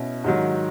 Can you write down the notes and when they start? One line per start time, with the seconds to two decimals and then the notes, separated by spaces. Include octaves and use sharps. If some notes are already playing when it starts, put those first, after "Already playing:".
Already playing: B2 C#4 E4
0.24 G#2 D#3 F#3